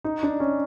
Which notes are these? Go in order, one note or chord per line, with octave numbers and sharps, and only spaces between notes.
D#4
D4
C#4